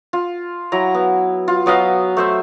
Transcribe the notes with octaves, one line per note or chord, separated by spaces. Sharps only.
F4
F#3 E4 A#5
B3
F4
F#3 B3 D#5 F5
A3 C5 E5